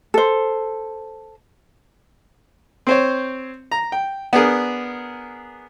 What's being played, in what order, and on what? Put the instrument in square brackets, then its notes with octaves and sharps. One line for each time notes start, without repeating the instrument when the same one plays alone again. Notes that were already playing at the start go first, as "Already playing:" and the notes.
[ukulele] A4 C5
[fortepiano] C4 C5 C#5
A#5
G5
B3 D4 G#4 A#4